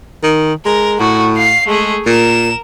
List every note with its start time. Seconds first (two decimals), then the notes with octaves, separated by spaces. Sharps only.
0.23 D#3
0.66 G#3 A#4
1.00 A2 F#4
1.36 F5 C7
1.67 G#3 A3 G#4
2.06 A#2 A#4 E7